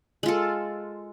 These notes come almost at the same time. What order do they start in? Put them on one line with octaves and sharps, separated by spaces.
G#3 F4 A4